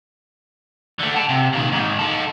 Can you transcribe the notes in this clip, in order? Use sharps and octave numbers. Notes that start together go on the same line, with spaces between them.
D3 A3
F#5 A5
C3
A#2 D#3
G#2 D#3
D#4 A4